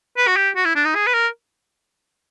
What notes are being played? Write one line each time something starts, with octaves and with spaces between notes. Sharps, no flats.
B4
F#4
G4
F#4
E4
D4
D#4
G#4
B4
A#4